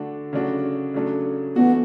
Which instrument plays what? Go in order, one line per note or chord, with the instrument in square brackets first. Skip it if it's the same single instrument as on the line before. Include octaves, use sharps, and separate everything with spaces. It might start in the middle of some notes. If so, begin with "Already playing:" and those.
Already playing: [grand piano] D3 A3 D4 F#4
C#3 F#3 A3 D4 F#4
C#3 F#3 A3 D4
[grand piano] E3 A3 D4 F#4 [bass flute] B3